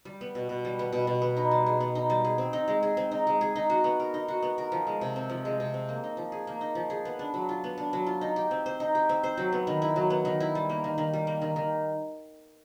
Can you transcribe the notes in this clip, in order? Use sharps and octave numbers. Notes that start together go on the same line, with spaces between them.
G3
B3
B2
B2
G3
B3
B2
B2
B3
D#4
G3
G#4
B3
D#4
G3
G#4
C4
D#4
G#3
G#4
C4
D#4
G#3
G#4
D#4
F#4
B3
A#4
D#4
F#4
B3
A#4
F3
G#3
C3
C4
F3
G#3
C3
C4
A#3
D#4
F3
G#4
A#3
D#4
F3
G#4
B3
D4
F#3
F4
B3
D4
F#3
F4
D#4
G4
C4
C5
D#4
G4
C4
C5
F#3
B3
D#3
E4
F#3
B3
D#3
E4
G3
A#3
D#3
D#3
G3
A#3
D#3
D#3